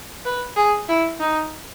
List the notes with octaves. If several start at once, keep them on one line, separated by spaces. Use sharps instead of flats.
B4
G#4
E4
D#4